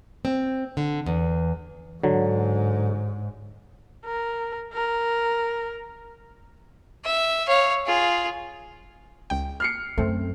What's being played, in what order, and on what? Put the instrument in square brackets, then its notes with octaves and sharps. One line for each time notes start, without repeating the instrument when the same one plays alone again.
[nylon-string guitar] C4
D3
E2
[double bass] G#2 [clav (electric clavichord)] D3 F#3
[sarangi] A#4
A#4
[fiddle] E5
C#5 F5
F4 G#4
[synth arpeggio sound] C#2 G5
[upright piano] F6 C7 C#7
[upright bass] F#2 [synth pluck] A3 C4